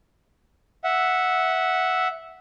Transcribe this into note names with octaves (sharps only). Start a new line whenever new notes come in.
E5 F#5